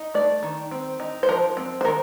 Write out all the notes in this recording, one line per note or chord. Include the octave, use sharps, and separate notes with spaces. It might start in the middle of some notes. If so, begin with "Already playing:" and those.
Already playing: D#4
A3 D5
D#3
C4
D#4
C5
F3 A#4
C4
C5
D#3 A#4